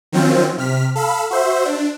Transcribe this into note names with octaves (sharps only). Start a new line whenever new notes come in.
D#3 F3 F#3 C4 C#4 F4
C3 F6 B6
A4 F5 B5 E6
F#4 C5 E5
D4